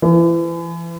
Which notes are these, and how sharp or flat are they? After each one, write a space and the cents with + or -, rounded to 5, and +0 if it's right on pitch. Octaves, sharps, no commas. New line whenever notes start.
E3 +35